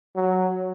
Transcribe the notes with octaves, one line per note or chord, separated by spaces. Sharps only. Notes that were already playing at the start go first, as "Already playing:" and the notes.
F#3